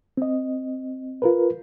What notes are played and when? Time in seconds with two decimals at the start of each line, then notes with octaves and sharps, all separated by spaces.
0.17 C4 D#5
1.22 F4 A#4 B4